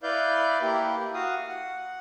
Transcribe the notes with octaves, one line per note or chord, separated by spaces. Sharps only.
E4 B4 D5 F5 G6
A#3 E4 G4
F#4 F5 D#6
F#5